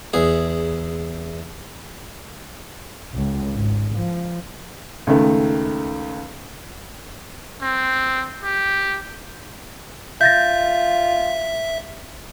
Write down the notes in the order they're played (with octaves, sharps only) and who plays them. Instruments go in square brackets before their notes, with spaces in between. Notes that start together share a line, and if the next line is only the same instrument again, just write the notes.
[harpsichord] E2 G#4
[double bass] C#2
G#1
F3
[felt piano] C#2 D#3 A3
[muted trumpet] C4
G4
[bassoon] F4 [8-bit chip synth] E5 [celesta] G6 A6 A#6